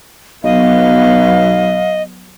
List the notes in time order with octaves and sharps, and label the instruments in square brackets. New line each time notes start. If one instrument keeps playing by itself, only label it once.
[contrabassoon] B1 [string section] F#3 B3 [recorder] D#5 [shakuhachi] F5